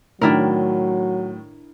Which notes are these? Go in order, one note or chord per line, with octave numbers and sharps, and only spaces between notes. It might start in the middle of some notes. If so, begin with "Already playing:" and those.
A2 D#3 F#3 D4 E4 A#4